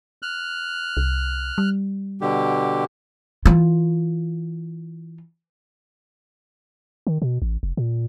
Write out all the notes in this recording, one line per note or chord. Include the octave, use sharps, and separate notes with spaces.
F6 F#6
C2
G3
B2 D3 G4
E3 F4
D#3
B2
A1
F1
A#2